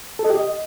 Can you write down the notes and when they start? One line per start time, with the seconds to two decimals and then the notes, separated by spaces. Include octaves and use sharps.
0.19 A4
0.25 D#5
0.30 G4
0.35 D#5